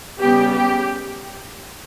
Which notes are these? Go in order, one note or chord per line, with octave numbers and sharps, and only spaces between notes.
C#3 G3 B3 G4
G4